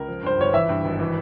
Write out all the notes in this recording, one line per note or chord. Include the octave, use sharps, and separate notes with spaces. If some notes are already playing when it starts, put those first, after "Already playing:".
Already playing: C#2 A#4
F3
G2 C5
G1 C#5
E3 E5
G2
G#1
E3